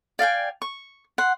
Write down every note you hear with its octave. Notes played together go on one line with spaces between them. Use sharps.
D5 F5 G5 G#5
C#6
F#5 C6